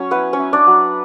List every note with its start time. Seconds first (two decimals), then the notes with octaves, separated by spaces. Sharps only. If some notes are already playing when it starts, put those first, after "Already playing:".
Already playing: F#3 C#4 C#5
0.11 B3 E4 B4
0.33 C#4 C#5
0.39 E4
0.53 D4 D5
0.67 F#3